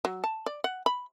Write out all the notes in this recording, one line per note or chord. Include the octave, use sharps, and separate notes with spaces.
F#3
A5
D5
F#5
B5